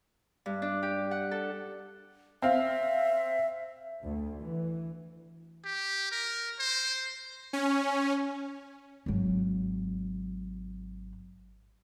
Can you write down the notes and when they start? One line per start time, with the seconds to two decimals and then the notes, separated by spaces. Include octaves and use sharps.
0.46 G2
0.62 D4
0.83 G4
1.11 F#5
1.31 A4
2.42 C4 E5 F5
4.03 D2
4.40 E3
5.65 G4
6.12 A#4
6.59 C5
7.53 C#4
9.06 G#1 F#3